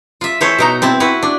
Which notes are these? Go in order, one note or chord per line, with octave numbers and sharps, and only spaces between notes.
F4 E5
E3 A3 C5 C#5 E5
B2 D#4 A#5
C4 E4 A5
E4 F#4 B4
D4